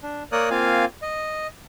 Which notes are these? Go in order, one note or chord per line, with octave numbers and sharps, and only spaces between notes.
D4
A#3 A#4 C#5 D5 D#6 F#6
A#3 C4 F4 F5 G#5
D#5